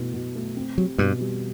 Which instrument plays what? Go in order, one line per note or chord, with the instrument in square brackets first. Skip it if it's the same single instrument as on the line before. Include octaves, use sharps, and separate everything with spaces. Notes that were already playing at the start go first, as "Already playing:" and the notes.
Already playing: [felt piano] B2 A3 E4
B2
A3
C4
[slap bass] F#3 [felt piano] G4
[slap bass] G2 [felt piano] B2
[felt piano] G3